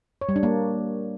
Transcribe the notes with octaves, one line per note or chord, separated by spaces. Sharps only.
C#5
G3
D4
A#3